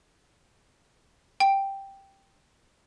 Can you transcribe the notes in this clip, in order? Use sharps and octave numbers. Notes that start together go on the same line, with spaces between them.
G5